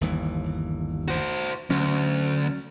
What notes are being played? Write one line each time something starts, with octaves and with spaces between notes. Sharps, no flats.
G1 D#2 E3
F#4 C5
D2 F#3 C#4